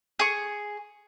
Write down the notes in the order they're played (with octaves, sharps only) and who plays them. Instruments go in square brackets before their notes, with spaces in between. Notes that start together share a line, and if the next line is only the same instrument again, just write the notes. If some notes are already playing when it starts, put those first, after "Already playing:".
[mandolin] G#4 C#6